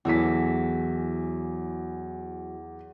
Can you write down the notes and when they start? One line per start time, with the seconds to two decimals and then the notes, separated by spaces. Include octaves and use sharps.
0.05 E2 E3 F#3 A4 B6